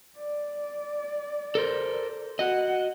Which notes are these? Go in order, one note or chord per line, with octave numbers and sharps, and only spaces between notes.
D5
A4 A#4 C5
F#4 D#5 F#5